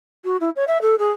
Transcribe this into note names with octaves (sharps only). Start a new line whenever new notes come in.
F#4
E4
C#5
E5
A4
G#4